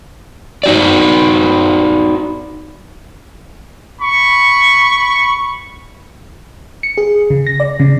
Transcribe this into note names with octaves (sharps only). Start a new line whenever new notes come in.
D#4 F#4 D5
B5 C#6
C#7
G#4
C#3
A#6
D5
C#3